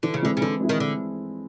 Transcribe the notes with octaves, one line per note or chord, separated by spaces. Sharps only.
D3 E3
C#3
D3 G#3 C4 E4
C#3
D3 E3
G#3 C4 E4
D#3
D3